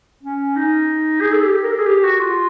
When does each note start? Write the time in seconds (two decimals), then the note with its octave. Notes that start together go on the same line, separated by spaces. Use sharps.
0.23 C#4
0.56 D#4
1.21 G#4
1.33 A4
1.43 G4
1.63 A#4
1.71 A4
1.79 G#4
1.86 G4
2.03 F#4
2.19 F4